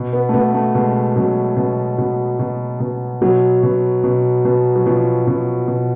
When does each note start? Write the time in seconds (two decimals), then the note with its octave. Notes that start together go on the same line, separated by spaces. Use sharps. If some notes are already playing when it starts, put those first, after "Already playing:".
Already playing: B2
0.13 B3
0.29 A3
0.34 B2 B3
0.54 A3
0.75 B2 G#3
1.16 B2 F#3
1.57 B2
1.98 B2
2.39 B2
2.80 B2
3.21 B2 F#3
3.63 B2
4.04 B2
4.45 B2
4.76 F#3
4.86 B2 F3
5.27 B2
5.68 B2